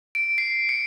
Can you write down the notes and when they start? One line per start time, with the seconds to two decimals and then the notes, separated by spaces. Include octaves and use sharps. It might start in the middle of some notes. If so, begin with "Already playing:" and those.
0.15 D7
0.38 C7
0.69 C#7